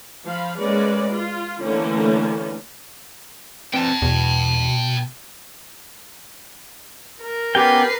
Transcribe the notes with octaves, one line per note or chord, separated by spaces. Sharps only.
F3 F5 B5
G#3 A#3 C#4 B4 D5
F4
D3 E3 A3 A#3 C#4
C4 B4 D5 G5 A5
E2 B2
A#4
B3 C#4 G4 B4 G5 C7